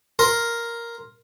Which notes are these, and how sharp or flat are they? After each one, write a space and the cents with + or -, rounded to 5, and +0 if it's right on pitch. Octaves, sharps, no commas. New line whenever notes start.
A#4 +0 C6 +0